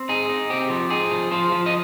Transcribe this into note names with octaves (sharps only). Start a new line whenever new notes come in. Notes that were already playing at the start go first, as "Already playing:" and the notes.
Already playing: C4
D#4 G#4
D#4
C4 G4
F3
D#4 G#4
F3
F3 C5
F3
D#5